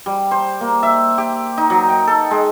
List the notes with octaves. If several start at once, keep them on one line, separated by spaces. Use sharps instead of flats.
G3
C5
A#3
E5
G4
D#4
F#3
G5
A4
G#3